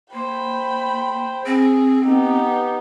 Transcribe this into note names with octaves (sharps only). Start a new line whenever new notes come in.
A#3 C5 G5 B5
C4 G#4
B3 D#4 G4